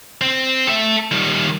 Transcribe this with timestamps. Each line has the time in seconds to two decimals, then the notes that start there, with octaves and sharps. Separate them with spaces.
0.21 C4
0.67 A4 E5
1.11 D#3 G3